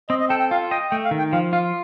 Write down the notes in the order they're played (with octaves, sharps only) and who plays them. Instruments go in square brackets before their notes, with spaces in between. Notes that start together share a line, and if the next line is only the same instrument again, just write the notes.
[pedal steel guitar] C4 [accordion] D#5
[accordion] D#5
[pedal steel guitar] A4 [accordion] G5
[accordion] G5
[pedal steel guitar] F4 [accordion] F5
[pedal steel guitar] D#5 [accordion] G5
[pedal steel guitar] A3 [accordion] G5
[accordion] F5
[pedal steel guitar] D#3
[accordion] G5
[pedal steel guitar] F3 [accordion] F5
[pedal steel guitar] F4 [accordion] F5